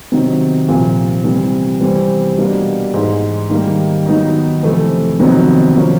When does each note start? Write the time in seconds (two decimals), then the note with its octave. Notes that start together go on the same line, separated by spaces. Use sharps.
0.12 C3 D#3 F#3
0.68 C2 A#2 F3
1.24 C3 E3 G3
1.80 C3 E3 G3 C4
2.37 B2 G3 A#3 D4
2.94 G#2 E3 G#3
3.50 D#3 G3 A#3
4.06 D#3 F#3 B3 D#4
4.63 F2 C3 E3 A3
5.19 F2 C3 D#3 F#3 B3
5.75 C3 F3 A#3 C#4